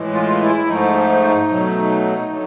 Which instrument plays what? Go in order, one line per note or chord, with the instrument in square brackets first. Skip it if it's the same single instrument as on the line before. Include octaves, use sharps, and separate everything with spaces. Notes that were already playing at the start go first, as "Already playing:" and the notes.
Already playing: [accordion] A2 E3 G#3
F4
D#4
E4
G#2 F3 A3 D#4
B2 F#3 A3
D3 F#3 A3